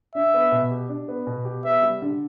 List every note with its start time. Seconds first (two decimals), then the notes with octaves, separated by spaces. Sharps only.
0.15 D4 E5
0.34 B3
0.52 B2
0.71 G4
0.89 D4
1.08 B3
1.27 B2
1.45 G4
1.64 B3 E5
1.82 G3
2.02 D3